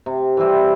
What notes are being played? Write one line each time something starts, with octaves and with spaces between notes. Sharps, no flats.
C3
E3 G3 C4